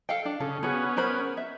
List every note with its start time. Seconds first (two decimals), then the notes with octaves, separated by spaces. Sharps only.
0.09 A4 F5 G5
0.25 D4
0.40 C#3 A4
0.63 B3 C#4 F#4 G#4
0.97 A#4 C5 B5
1.37 E5